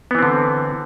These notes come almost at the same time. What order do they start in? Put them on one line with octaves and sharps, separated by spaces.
B3 E3 C4 D3